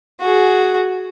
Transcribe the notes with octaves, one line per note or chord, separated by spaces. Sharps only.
F#4 G#4